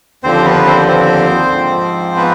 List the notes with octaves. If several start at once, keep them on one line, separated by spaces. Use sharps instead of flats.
D#2 D3 F3 C4 C5
B3 B4
C4 C5
C4 C5
G#2 F3
B3 B4